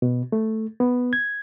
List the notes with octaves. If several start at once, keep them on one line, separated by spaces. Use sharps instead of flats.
B2
A3
B3
G#6